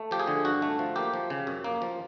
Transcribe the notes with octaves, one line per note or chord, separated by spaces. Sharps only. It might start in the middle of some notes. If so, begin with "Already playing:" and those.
Already playing: A3
F3 G4
G#4
D3
G2 F#4
A3
F3
A#3 G4
F3
C#3
F#2
A#3
F3